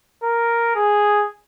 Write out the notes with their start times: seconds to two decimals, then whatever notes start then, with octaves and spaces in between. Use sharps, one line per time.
0.23 A#4
0.75 G#4